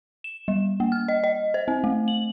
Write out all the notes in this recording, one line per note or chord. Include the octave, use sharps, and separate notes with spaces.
E7
G3
A#3
F6
D#5
D#5
C5
C4
A3
F#7